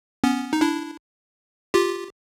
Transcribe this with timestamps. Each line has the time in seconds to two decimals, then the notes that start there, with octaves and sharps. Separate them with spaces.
0.24 B3 C#4
0.53 D#4
0.61 D4 E4
1.74 F4 G4